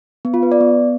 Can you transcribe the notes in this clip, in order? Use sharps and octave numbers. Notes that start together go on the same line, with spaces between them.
B3
F4
B4
D5
B3